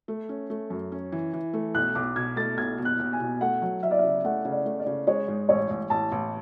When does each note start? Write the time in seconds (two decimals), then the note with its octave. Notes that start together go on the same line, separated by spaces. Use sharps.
0.08 A3
0.29 C#4
0.50 A3
0.70 F#2
0.92 C#4
1.12 E3
1.33 E3
1.53 A3
1.74 B1 F#6
1.95 B1 D6
2.16 B2 G#6
2.36 A3 A6
2.58 B1 G#6
2.78 B2
2.85 F#6
2.99 B1
3.13 G#5
3.20 B2
3.41 A3 F#5
3.62 F#3
3.83 F#3 E5
3.91 D5
3.99 E5
4.03 C#3
4.24 A3 F#5
4.45 C#3
4.52 D5
4.66 A3
4.80 D5
4.86 C#3
5.07 G#3 C#5
5.28 G#2
5.49 A1 C#5
5.70 A1
5.90 A1 A5
6.12 A1